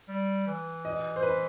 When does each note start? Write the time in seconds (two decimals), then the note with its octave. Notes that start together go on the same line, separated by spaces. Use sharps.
0.09 G3
0.47 E3
0.85 D#5
1.16 C5
1.23 B4